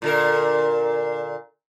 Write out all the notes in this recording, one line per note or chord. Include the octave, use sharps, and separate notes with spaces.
A#2 D3 A#4